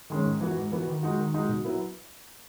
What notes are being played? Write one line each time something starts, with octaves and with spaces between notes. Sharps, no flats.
D#3 G#3 C#4
G#2
E3 B3 F#4
G#2
E3 B3 F#4
D#3
G#3 D#4 F#4
D#3
G#3 D#4 F#4
B2
F#3 B3 E4